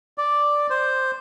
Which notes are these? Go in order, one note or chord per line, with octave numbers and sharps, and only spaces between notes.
D5
C5